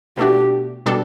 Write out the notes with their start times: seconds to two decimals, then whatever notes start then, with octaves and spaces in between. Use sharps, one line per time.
0.17 B2 A3 D4 F#4 G4
0.86 B2 G3 D4 A4